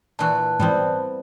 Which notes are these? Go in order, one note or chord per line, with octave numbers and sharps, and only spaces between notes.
A#2 E3 F#4 A5 F#6
G#2 E3 G3 B3 C4